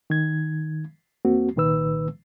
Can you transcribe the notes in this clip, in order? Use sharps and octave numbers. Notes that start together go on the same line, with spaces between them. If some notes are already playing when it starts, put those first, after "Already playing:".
D#3 G#6
E2 A#3 C4 F#4
C2 A#2 D#3 B4 E6